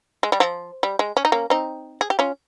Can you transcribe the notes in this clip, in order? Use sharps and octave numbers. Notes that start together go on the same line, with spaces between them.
G#3
G3
F3
G3
G#3
C#4
D#4
A#3 C#4
C4 D#4
G#4
G4
C#4 F4